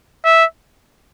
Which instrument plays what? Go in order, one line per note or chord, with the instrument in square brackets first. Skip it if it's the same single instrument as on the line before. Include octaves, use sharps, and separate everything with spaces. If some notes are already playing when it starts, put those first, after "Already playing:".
[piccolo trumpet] E5